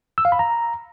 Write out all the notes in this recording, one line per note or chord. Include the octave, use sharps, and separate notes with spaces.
E6
F5
B5
A#5